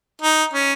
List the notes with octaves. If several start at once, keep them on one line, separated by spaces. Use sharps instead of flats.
D#4
C#4